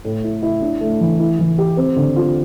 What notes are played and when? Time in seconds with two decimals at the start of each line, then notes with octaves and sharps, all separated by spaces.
0.04 A2
0.24 E4
0.43 E4
0.62 D4
0.81 A3
1.01 E3
1.20 E4
1.39 E3
1.58 G4
1.77 C4
1.96 D3
2.16 F4